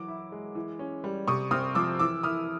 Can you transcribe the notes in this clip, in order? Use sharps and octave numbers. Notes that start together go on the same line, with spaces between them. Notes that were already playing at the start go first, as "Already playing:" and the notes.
Already playing: E3 F#3 D6
E4
G#3
E3
C#4
G3
C3 C#6 D#6
C4 D#6 F6
F3 D6 E6
E3 D6 E6
E4 D#6 F6